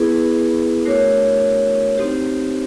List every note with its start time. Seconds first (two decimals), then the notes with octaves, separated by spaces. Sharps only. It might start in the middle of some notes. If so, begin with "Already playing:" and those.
Already playing: B3 E4 G#4 B4
0.85 A3 D4 F#4 A#4 C#5
1.96 C4 D#4 G4 C5